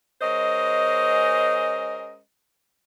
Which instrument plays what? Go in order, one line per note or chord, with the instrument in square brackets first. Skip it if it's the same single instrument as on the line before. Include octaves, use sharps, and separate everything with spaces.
[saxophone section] G#3 C#4 A#4 C5 D#5